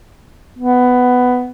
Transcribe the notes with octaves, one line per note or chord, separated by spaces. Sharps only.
B3